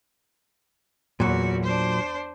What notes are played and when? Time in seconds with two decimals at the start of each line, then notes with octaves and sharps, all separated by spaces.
1.20 E2 A#2 F#3 F#4
1.64 D4 C5